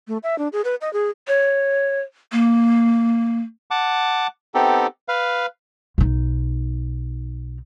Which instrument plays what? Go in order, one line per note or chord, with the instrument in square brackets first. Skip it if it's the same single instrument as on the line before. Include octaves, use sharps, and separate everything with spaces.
[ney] A3
E5
D4
G#4
B4
D#5
G#4
[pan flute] C#5
A#3
[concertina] F#5 A5 D6
B3 C4 D#4 G4 A4
B4 F5
[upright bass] B1 D#4